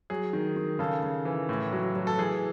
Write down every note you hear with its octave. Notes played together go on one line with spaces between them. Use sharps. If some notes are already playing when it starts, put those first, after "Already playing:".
F#3 G#4
D#3
D#3
C#3 A4
C#3
E3
A2
F#3
F#3
A4
E3 G#4